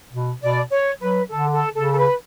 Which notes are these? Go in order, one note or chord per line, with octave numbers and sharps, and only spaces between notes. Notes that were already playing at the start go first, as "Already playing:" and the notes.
B2
B2 D5
C#5
F#3 B4
D3 A4
A4
C#3 A4
A4
B4